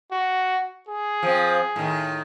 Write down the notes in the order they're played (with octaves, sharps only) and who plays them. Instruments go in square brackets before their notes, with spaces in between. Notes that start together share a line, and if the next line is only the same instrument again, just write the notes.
[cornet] F#4
G#4
[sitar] F3 C4
A2 D#3